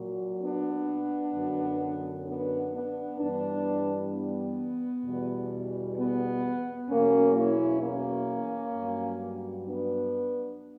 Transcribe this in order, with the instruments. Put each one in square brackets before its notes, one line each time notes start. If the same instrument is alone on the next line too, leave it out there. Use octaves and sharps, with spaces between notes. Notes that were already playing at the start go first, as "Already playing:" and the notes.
Already playing: [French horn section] A#2 F#3
B3 D4
F#2 D3 F#3
B3 D4
B3 D4
G2 E3 G3 B3 D4
B3
E2 B2 G3
B3
E2 B2 F#3 A#3 C#4
C#4 E4
A#3 C#4
G2 F#3
B3 D4